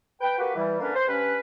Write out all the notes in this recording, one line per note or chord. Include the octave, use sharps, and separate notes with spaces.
B4 G5
A#3 F#4 G4 B4
E3 G3
D3 A#3 C#4 D4 B4
C5
G2 C#4 B4